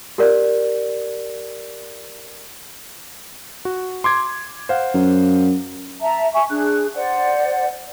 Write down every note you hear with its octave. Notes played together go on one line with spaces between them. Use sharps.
G4 A#4 D5
F#4
C6 D6 G#6
C5 F5 F#5
F#2
E5 A5 A#5
E5 G#5 C#6
D4 G#4 F#6
C5 D5 F#5